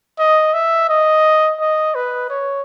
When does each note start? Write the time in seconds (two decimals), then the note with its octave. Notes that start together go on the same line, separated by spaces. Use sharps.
0.19 D#5
0.54 E5
0.89 D#5
1.60 D#5
1.95 B4
2.30 C#5